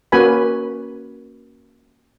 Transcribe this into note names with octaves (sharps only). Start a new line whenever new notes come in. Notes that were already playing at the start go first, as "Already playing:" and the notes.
A#3 C#4 F#4 B4 G#5 B5